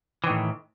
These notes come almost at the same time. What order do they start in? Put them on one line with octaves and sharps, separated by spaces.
E3 D#3 A2